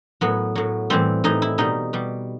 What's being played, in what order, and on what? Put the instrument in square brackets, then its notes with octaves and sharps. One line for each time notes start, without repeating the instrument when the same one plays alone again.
[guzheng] A2 F#3 B3
A2 F#3
A2 E3 G3 C4
A2 E3 G3 D#4
E4
B2 G3 D#4
B2 G3